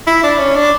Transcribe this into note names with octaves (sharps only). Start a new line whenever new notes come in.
E4
D4
C#4
D4